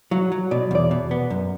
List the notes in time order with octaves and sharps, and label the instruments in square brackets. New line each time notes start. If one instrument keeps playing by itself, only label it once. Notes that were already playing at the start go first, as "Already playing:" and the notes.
[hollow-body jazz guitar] F#3 [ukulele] F#4
[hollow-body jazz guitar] F#3
[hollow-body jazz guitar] B2 [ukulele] D5
[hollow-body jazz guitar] E2 [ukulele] D5
[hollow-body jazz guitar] B2
B3
F#2